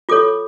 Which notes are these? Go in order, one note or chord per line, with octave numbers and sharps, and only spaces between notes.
F4 A4 C#5 D6